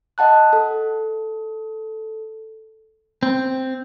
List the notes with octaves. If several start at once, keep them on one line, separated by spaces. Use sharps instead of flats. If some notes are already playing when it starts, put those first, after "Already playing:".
D#5 F#5 A5 F#6
A4
C4